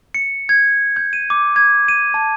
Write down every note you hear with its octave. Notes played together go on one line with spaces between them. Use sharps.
C#7
G#6
G6
D#7
D6
G#6
D#7
A5